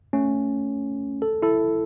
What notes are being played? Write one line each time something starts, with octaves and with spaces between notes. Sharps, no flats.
A3 C#4
A4
E4 A4